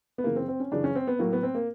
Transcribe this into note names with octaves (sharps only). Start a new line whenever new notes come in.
B3
F#2 C#3 E3 A#3
C4
C4
C#4
F#2 C#3 E3 D4
C#4
C4
B3
A2 F#3 A#3
B3
C4
A#3